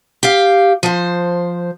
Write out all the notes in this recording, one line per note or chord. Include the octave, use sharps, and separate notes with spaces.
G4 F5
F3 C5